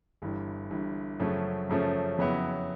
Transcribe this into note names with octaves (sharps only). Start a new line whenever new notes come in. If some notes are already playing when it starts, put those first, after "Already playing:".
G1 G2 E3
G1 G2 E3
F#2 C#3 F3 A3 C#4
F#2 C#3 F3 A3 C#4
F2 C#3 F#3 B3 E4